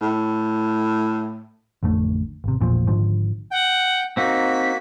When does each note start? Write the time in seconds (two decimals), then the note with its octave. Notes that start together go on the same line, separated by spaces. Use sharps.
0.01 A2
1.83 A1 F2 D3 A3
2.44 G#1 C3
2.61 A1 E2 A#2 F3
2.87 G#1 G#2 D3 F3
3.51 F#5 G5
4.17 A#3 C4 D#4 F#4 B6